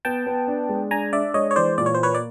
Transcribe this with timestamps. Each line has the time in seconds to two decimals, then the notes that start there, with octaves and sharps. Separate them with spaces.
0.05 B3 G5 A5
0.26 B3
0.48 D4
0.69 G#3
0.91 D4 G#5 A#5
1.13 D4 D5 E5
1.34 G#3 C#5 D#5
1.51 C#5
1.56 E3 C5 D5
1.78 A#2 D5
1.86 C#5
1.94 C5
1.99 A#3 B4 C#5
2.15 D5